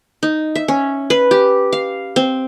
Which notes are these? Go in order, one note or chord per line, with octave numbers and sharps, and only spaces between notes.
D#4
E5
C#4
B4
G4
F5
C4